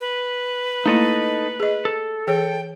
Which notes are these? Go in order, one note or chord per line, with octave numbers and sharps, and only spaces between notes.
B4
A3 A#3 D#4 E4 A4 D#5
G#4 D#5
A4
E3 G#4 C#5 G5